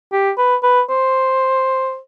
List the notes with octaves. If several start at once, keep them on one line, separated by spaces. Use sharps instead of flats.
G4
B4
B4
C5